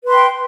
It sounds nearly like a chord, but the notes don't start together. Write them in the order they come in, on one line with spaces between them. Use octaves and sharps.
B4 C6 G5